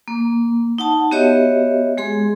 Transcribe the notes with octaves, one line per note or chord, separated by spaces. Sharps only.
A#3
D#4 F#5 A5
B3 F#4 G4 C#5 D#5 E5
G#3 G#4 C6